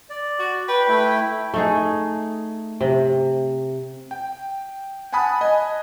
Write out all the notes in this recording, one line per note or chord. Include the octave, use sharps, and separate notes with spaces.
D5
F#4
B4 G5
A3 E4 G5
A3 D#4 G#4
C3
G5
F#5 G#5 A5 B5 D#6 F#6
D#5 G#5